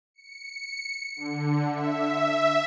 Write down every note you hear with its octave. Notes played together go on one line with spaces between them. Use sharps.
C#7
D3
E5